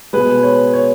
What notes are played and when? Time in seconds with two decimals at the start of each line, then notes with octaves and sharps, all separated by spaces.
0.13 B2 G#3 B4
0.43 C#5
0.73 C#5